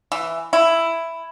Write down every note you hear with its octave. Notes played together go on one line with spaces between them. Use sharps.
E3
E4